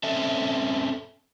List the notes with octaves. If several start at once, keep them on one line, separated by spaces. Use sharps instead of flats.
C4 C#4 A4 E5